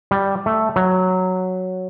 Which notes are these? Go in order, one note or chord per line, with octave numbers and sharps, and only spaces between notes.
G3
A3
F#3